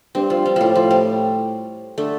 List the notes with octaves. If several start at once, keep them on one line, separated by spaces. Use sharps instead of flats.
G2 C4
F3
G3
A2 F3 G3
F3
G3
D3 A3